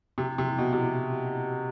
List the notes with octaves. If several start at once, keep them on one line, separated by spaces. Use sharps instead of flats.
C3
C3
B2
C3